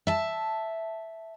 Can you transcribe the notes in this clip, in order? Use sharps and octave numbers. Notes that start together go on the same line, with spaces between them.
E5 A5